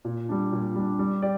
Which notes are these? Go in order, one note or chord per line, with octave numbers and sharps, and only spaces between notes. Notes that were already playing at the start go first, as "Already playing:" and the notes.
A#2
G3 D4
A#2
G3 D4
G3
G4 D5